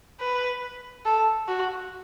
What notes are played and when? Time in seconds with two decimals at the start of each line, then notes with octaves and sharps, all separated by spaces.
0.20 B4
1.05 A4
1.48 F#4